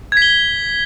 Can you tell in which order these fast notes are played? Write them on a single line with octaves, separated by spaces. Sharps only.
G#6 B6 G7